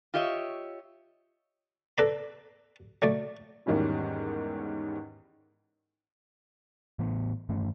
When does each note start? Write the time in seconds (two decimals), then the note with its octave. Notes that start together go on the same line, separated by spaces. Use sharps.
0.14 F4 G4 C#5 D#5 E5
1.98 A4 B4 D5 A#5 B5
3.02 F#3 A3 D5
3.66 E2 G#2 D#3 G3 C#4 E4
6.99 A2 E3 B3
7.49 G2 E3 A3 C#4